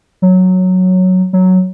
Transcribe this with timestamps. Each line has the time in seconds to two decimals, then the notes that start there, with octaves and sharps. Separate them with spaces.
0.22 F#3
1.33 F#3